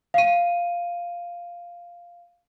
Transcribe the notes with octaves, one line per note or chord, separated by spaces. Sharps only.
F5 D#7